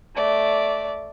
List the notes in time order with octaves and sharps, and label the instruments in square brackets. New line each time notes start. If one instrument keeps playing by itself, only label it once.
[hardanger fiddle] A3 D5